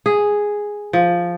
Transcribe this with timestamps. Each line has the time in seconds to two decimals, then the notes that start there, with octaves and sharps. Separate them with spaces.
0.06 G#4
0.93 F3